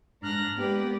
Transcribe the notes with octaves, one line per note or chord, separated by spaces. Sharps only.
G#2 D4 A#5 F6 F#6 A#6
G#3 A#3 B3 G4 B4 D5